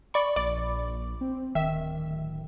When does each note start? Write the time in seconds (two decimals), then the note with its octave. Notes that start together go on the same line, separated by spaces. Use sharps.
0.14 D5 B5 C#6
0.36 A#1 D5 D6
1.21 C4
1.55 D1 D#3 E5